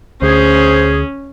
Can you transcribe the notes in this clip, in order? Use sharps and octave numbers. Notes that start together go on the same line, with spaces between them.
D2 C#4 G#4 C5